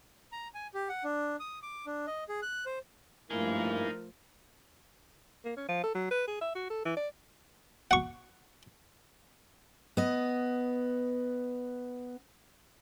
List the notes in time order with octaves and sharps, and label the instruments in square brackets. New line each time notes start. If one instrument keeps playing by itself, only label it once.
[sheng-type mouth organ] A#5
G#5
G4
F#5
D4
D#6
D6
D4
D#5
G#4
F#6
C5
[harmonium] G2 A#3 E4 [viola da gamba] F3 A3 [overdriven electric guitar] D#4 G#4 [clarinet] A#4
[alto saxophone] A#3
C#4
F3
A4
F#3
B4
G#4
E5
F#4
A4
E3
D5
[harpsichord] F#5 C#6
[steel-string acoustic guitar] B3 D#5